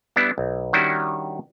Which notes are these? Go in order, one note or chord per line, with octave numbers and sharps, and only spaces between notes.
G3 B3 D4 E4
B1
D#3 G3 C#4 D4 E4 F#4